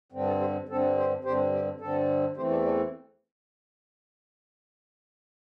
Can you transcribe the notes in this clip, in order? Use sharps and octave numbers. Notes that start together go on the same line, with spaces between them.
G2 D3 C4
A4
G4 C5
G2 D3 C4 A4
G4 C5
G2 D3 C4 G4 C5
G4
G2 D3 C4 A4
E2 E3 A3 C4 G4 C5
A4 D5
A4 D5